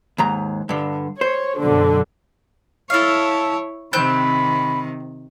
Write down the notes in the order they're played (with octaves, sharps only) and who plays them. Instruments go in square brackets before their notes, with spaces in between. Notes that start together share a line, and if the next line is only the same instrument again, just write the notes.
[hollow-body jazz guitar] D#2 G#2 A#5
G2 D3
[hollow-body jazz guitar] C5 [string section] C#5
[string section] F#2 B2 D3
[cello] E4 C#5 [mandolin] A4 F5
[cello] C3 D#3 [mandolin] C4 F#6 G6 [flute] B5